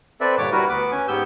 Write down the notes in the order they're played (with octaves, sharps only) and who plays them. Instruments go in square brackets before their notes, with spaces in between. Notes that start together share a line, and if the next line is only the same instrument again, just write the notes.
[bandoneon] C4 A4 B4 D5 E5
G2 A#2 D3 C#5 D6
G3 E4 F#4 A#4 B4
D2 B3 B4 D6
C#4 G#5
G#2 B3 G4 E6 G6